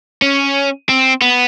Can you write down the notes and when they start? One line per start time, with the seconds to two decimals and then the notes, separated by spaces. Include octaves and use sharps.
0.22 C#4
0.89 C4
1.21 B3